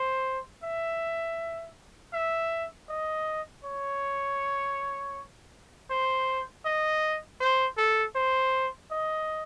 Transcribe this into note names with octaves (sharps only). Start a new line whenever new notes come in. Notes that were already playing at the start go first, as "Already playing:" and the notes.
Already playing: C5
E5
E5
D#5
C#5
C5
D#5
C5
A4
C5
D#5